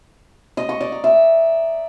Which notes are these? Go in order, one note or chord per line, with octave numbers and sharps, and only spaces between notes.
D#5
C#6
D5
A#5
E5